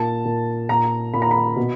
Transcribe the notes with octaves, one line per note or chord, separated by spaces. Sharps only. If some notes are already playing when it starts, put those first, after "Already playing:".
Already playing: A#2 A5
A#2
A#2 A#5
A#2 B5
A#5
B5
B2